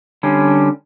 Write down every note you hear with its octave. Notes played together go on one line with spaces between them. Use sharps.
D3 G3 C#4